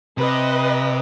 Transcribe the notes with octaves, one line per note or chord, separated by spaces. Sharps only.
C3 B4 D#5